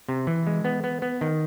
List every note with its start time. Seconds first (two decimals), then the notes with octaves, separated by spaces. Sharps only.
0.09 C3
0.27 E3
0.47 G#3
0.65 B3
0.84 B3
1.02 B3
1.21 D#3